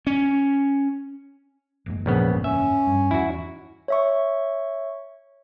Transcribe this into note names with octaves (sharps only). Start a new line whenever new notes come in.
C#4
F#1 E2 G#2
A#1 C#3 B3
C#4 E5
G2
E2 E4 F#4
C#5 E5 C#6